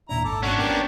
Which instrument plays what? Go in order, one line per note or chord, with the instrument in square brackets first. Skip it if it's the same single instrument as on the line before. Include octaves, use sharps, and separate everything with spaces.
[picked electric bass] D#2 A#2 D4 [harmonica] E4 A#5
[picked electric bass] G#1 [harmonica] A4 A5 D6
[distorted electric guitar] C#4 D4 [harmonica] F#4 F#5
[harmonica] A#3 G4 D5 [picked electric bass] B3